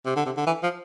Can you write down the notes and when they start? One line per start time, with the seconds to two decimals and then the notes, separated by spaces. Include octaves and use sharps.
0.06 C3
0.16 D3
0.26 C3
0.37 D3
0.47 E3
0.63 F3